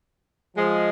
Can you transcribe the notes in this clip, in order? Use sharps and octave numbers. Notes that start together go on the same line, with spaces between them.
F3 G#3